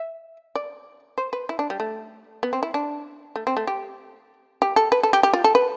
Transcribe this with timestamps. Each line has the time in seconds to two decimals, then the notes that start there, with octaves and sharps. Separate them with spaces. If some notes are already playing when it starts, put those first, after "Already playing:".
Already playing: E5
0.55 D5
1.18 C5
1.33 B4
1.49 E4
1.59 D4
1.70 G3
1.80 A3
2.43 B3
2.53 C4
2.63 E4
2.74 D4
3.36 A3
3.47 C4
3.57 A3
3.67 G4
4.62 G4
4.76 A4
4.92 B4
5.03 A4
5.13 G4
5.23 G4
5.33 F4
5.44 A4
5.55 B4